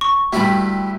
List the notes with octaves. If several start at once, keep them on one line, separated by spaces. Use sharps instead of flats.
C#6
D2 G2 E4 G4 B5